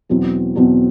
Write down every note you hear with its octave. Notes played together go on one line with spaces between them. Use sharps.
E2 B2 F#3 C4 E4
E2 B2 F#3 C4 E4